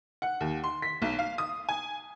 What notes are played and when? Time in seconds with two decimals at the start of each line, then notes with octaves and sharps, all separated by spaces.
0.22 F#5
0.41 D#2
0.64 C6
0.82 B6
1.02 B1
1.19 F5
1.38 D#6
1.69 G#5